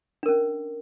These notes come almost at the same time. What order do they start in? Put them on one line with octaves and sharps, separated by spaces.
D4 A#4 C#4